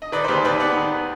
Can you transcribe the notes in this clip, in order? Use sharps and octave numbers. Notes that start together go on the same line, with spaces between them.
D#5
D#3 B4 D5
C5
D#2 G4 B4
D#2 B4 D5
B3 B4 D5
D#3